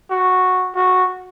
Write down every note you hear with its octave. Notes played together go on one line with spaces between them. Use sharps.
F#4
F#4